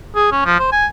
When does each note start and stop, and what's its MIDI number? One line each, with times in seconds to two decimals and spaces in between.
0.16 0.29 68
0.32 0.43 61
0.45 0.57 53
0.59 0.68 72
0.72 0.86 80